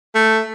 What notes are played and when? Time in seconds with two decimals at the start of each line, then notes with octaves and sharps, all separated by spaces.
0.15 A3